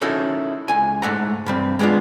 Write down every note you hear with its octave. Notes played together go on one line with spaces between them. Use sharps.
C#4 D#4 E4 F#4 A4 A#4
C#2 G#5
G#2 A3 F#5 A#5
G2 G3 C4
G#3 A#3 B3 D4 F4